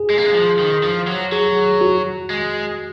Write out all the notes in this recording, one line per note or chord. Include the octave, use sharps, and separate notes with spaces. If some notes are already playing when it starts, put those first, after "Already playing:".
Already playing: G#4
G#3
A#3
G#3
F3
D#3
F3
F#3
F#3 G#4
F#4
G#3